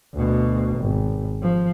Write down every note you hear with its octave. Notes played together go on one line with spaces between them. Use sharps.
D2 B2
G#1
F3